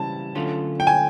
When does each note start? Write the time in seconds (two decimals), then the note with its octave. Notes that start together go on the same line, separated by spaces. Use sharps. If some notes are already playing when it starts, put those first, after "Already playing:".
Already playing: C#3 E3 G3 C4 E4 A5
0.35 D3 F#3 A3 C#4 F4
0.80 G5
0.87 G#5